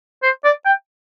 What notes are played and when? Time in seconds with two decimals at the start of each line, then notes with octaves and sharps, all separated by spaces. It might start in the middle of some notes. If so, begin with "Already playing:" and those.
0.23 C5
0.44 D5
0.65 G5